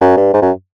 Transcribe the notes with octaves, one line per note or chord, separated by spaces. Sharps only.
F#2
G2
G#2
F#2